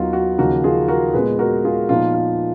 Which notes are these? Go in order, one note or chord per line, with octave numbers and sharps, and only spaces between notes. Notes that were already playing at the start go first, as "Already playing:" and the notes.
Already playing: D#2 D#3 F#3 B3 D#4 F4 F#4
F#4
D#2 C#3 F3 A#3 D#4 F#4 A#4
F4 G#4
F#4 A#4
A#2 G#3 B3 G#4 B4
F#4 A#4
F4 G#4
A#2 F3 B3 D#4 F4
F4